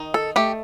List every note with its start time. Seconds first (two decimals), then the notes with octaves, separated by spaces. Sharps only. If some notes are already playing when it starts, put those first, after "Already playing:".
Already playing: D#3 D#4
0.14 A4
0.36 A3 G4